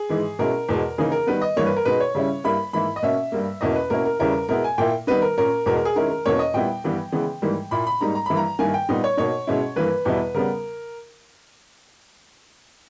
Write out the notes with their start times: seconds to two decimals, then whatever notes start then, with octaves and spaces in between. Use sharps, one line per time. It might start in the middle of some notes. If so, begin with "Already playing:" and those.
Already playing: G#4
0.09 G#2 E3 G#3
0.39 B2 G#3 C#4 E4 A#4
0.69 E2 B2 G#3
0.98 C#3 E3 A#3 D#4 G#4
1.12 A#4
1.27 D#3 G3 B3 B4
1.42 D#5
1.56 G2 E3 G3 A#3 C#5
1.66 B4
1.76 A#4
1.85 B2 G#3 D#4 B4
2.00 C#5
2.15 C#3 G3 C#4 E4
2.44 G2 G3 A#3 E4 B5
2.73 G#2 E3 A#3 E4 B5
2.96 D#5
3.03 B2 A#3 C#4 E5
3.32 G2 G3 A#3
3.61 E2 B2 A#3 C#4 E4 D#5
3.76 B4
3.90 B2 A#3 C#4 E4 A#4
4.05 A#4
4.19 E2 C#3 G3 C#4 E4 A#4
4.49 B2 G#3 B3 E4 A#4
4.64 G#5
4.78 A#2 A#3 E4 G5
5.07 D#3 G3 B3 D#4 B4
5.22 A#4
5.37 A#2 A#3 C#4 A#4
5.66 E2 B2 G#3 A#4
5.77 A#4
5.85 G#4
5.96 D#3 G#3 C#4 E4 A#4
6.10 A#4
6.26 E2 B2 A#3 C#4 C#5
6.39 D#5
6.54 A#2 G3 B3 E4 G5
6.84 G2 E3 G3 B3
7.12 C#3 E3 G#3 B3
7.42 G#2 E3 G3 A#3
7.71 A#2 A#3 E4 B5
7.87 B5
8.01 G#2 G3 A#3 D#4 A#5
8.15 A#5
8.26 G2 E3 A#3 E4 B5
8.37 A#5
8.59 G2 D#3 A#3 E4 G#5
8.74 G5
8.89 A#2 G3 B3 D#4
9.04 C#5
9.17 B2 A#3 D#4 C#5
9.47 B2 G#3 C#4 E4
9.76 G2 E3 A#3 B4
10.05 E2 B2 G3 B3 E4
10.34 C#3 G3 B3 A#4